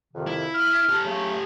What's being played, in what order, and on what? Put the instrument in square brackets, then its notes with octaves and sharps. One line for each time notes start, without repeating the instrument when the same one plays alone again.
[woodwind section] F2 C3 D#3
[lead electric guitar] E4
[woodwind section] F6
[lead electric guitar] G4 A4
[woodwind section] C#3 F#3 A3